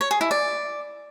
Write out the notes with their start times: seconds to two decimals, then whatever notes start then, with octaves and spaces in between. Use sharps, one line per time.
0.01 C#5
0.11 G#4
0.21 E4
0.31 D5